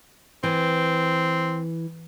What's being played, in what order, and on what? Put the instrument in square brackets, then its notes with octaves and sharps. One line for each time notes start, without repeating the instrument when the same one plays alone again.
[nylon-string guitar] E3 [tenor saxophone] C4